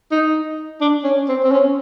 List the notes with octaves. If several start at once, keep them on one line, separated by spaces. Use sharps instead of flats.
D#4
D4
C#4
C4
C4
C#4